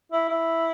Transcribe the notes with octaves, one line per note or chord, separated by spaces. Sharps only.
E4
E4